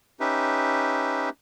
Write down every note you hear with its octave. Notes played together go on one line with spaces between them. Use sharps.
C#4 D#4 G4 B4 E5